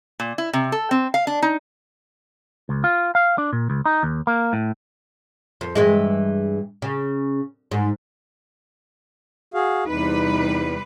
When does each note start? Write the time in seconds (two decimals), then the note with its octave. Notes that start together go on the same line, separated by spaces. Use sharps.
0.20 A#2
0.38 E4
0.53 C3
0.72 A4
0.91 C4
1.14 F5
1.27 D4
1.42 D#4
2.69 C#2
2.84 F4
3.15 F5
3.38 D4
3.53 A#2
3.70 C#2
3.85 D#4
4.03 D#2
4.27 A#3
4.53 A2
5.61 F2
5.75 G2 E3 G#3
6.82 C#3
7.71 G#2
9.54 F#4 G#4 F5
9.87 E2 C3 G3 D#4 B4